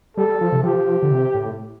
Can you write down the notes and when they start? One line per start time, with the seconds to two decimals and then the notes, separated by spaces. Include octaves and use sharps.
0.17 G3 A4
0.28 G3
0.41 F3
0.52 C3
0.63 F3 G4
1.03 D3
1.11 C3
1.34 A2